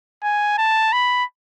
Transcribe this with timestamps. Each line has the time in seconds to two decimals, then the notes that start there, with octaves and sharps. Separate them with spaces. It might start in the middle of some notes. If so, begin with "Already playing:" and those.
0.23 G#5
0.58 A5
0.92 B5